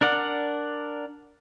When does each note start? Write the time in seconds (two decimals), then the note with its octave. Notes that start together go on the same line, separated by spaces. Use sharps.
0.01 D4 A#4 D5 F#5